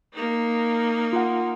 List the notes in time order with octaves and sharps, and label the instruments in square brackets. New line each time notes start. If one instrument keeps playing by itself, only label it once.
[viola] A#3 D#4
[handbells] F4 F#5